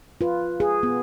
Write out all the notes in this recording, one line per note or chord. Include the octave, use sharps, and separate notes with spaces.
F4 B4
G#4
B3